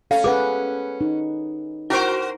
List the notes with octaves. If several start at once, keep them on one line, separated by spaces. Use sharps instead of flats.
C#4 A4 F5
G#4 B4 F#5 D6
D#4
E4 F#4 A#4 C5 C#6